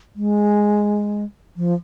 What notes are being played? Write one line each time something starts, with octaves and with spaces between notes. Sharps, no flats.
G#3
F3